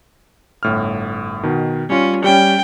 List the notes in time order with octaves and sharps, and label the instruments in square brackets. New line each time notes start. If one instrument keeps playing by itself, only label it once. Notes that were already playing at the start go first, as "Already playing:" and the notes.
[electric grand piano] G1 A2 F6
B2 D#3
[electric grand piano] G3 F4 [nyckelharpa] C#4
[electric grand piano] G3 C#4 [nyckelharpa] G5